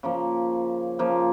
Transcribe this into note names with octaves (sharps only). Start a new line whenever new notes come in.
C#3 F3 A#3
C#3 F3 A#3